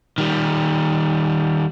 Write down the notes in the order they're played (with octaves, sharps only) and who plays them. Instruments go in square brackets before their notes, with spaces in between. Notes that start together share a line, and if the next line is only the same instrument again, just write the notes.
[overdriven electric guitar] D#3 G3